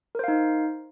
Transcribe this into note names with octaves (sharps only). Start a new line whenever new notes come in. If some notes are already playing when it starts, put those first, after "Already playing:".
D#4 A#4 C5 F5